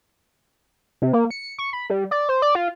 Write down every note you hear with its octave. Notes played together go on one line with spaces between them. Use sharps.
C3
A#3
C#7
C#6
B5
G3
D5
C5
D5
F4